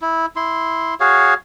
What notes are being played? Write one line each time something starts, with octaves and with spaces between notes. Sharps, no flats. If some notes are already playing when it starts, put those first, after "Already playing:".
E4
E4 C6
F#4 G#4 C#5 F5